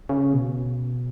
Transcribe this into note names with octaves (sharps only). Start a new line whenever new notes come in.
C#3
B2